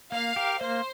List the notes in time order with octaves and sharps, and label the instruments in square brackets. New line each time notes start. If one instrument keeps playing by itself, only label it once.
[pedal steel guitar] A#3 [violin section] F5
[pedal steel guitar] G4 A#4
[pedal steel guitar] A#3 [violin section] C5